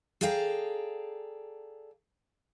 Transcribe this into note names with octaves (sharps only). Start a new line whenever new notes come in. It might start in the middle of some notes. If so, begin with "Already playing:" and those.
G#4 A4 D5 F5 G5 A#5